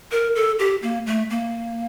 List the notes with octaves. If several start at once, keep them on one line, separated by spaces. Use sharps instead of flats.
A#4
A4
G4
A#3
A3
A#3